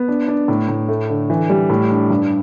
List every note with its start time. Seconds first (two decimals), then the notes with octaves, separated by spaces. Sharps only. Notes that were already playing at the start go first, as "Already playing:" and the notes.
Already playing: B3
0.08 D4
0.28 D4
0.48 A2
0.68 A2
0.88 A3
1.10 D3
1.30 E3
1.50 G3
1.70 A2
1.90 D4
2.10 G2